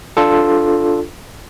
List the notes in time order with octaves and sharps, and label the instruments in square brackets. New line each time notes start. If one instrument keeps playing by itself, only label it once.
[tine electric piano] D4 F4 A4